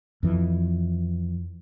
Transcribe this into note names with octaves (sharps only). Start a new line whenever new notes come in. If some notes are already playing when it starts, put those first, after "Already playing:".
F2 E3